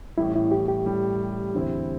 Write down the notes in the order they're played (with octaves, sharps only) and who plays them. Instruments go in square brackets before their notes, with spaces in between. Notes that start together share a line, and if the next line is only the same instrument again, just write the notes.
[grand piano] A1 A2 G3 [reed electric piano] E4
[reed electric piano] E4
G4
G4
[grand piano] A1 A2 G3
E2 D3 C4 E4